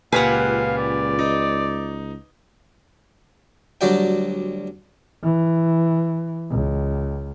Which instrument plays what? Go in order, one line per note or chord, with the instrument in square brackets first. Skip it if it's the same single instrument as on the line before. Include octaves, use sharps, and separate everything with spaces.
[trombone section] C#2 [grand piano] A#2 G4 G#5 [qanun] B4 F#5 [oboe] F5
[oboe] D5
[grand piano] D#4
[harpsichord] D2 F#3 G3 F#4 D5 G5
[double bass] E3
C#2